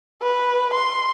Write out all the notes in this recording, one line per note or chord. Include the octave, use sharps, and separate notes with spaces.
B4
C6